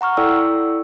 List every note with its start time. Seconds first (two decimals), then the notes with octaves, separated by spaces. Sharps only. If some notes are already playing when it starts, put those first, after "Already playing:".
0.01 F#5 A#5 C#6 F6
0.17 E4 A4 D5 G5 E6